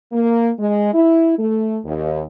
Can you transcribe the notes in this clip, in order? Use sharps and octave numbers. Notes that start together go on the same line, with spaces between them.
A#3
G#3
E4
A3
D#2